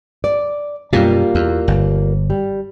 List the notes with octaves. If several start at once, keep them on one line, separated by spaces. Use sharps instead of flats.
D5
F#2 B2 G3 A#3 F4
E2
G1
G3